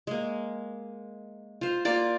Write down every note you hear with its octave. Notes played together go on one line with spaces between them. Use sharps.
G#3 A#3
F4 C5
A#3 F4 D5